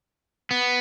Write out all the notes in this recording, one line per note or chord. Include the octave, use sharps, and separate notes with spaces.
B3